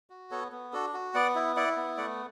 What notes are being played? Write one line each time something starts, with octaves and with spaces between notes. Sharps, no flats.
F#4
B3 A4 C#5
B3
D4 F#4 A4
F#4
B3 D5 F#5
E4
E4 D5 F#5
B3
A3 D5 F#5